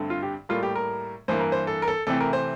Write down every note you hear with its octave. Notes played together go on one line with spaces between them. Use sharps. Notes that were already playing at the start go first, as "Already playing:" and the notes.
Already playing: G2 D3 A3 C4
F4
G4
A2 G3 A#3 F4
G4
A#4
G2 E3 A#3 C5
A#4
C5
A4
A#4
A4
C3 E3 A3 C4 A4
A#4
C5